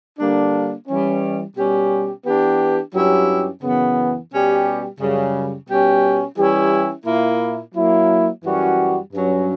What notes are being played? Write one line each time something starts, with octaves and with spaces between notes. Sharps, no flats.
D3 G3 A#3 D4
E3 G3 C#4
B2 G3 C#4 G4
E3 B3 D4 G4
G2 F#3 C#4 E4 G4
F#2 C#3 E3 B3
B2 G3 C#4 G4
F#2 C#3 G3
B2 G3 C#4 G4
E3 G3 C#4 E4 G4
A#2 A#3 E4
F#3 A#3 E4
F#2 E3 G3 C#4 F#4
G2 F#3 C#4